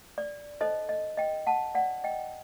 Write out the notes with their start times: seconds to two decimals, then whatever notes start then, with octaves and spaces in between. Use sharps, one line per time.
0.18 D5
0.61 D#4 A4 C5 D#5
0.89 D#5
1.17 D#5 G5
1.47 F#5 A5
1.75 D5 F#5
2.04 D#5 G5